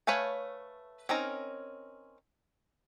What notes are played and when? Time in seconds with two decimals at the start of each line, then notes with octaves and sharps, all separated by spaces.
0.07 A3 B4 C#5 F5 G#5
1.09 C4 C#4 D#4 A#4